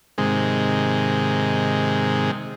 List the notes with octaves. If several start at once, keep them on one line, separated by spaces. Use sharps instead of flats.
G#2 C3 D#3 G#3